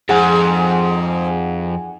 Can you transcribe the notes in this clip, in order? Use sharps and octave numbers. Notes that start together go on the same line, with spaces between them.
F2 G#2 F3 G#4 F#5 G#5